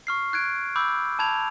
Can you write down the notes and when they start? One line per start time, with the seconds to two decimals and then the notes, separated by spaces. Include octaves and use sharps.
0.07 C#6 F6 C7
0.33 F#6 G#6 D7
0.76 B5 D6 E6 G6
1.19 A5 B5 G#6 F7